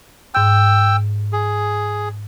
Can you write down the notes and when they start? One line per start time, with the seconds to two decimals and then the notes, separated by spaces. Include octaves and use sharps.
0.35 G#2 G5 E6 G6
1.33 G#4